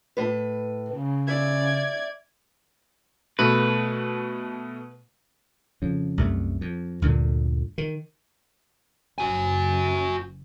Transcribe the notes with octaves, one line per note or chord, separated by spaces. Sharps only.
A2 B4
C#3
D5 E5 G#6
B2 A3 B4
F2 C#3
C2 F#2 A3
F2
D2 G2 A#2 D3
D#3
F#1 F#4 G#5